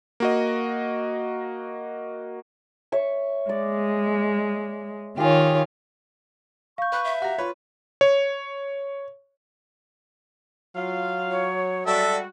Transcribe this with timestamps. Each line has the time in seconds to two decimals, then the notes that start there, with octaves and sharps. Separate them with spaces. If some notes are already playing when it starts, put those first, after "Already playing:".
0.20 A#3 F#4 D#5
2.92 C#5 E5
3.49 G#3 D5
5.18 D#3 F4 G4 G#4 C#5
6.78 F5 C#6 G6
6.92 B4 F#6
7.04 E5
7.22 F#4 G4 A#5
7.38 F4 B4 C#5
8.01 C#5
10.76 F#3 F4 F5
11.31 C#5
11.87 G3 G#3 F#4 A4 D5 E5